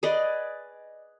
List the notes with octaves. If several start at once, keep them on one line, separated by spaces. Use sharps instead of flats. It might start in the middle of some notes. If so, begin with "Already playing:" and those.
G#4 B4 D5 D#5